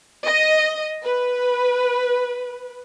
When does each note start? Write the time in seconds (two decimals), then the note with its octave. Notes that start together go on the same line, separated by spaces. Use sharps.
0.24 D#5
1.03 B4